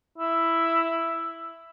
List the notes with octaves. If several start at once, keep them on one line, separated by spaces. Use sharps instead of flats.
E4